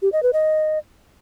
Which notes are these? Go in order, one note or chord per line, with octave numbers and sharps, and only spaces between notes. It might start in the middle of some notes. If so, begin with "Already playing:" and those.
G4
D#5
B4
D#5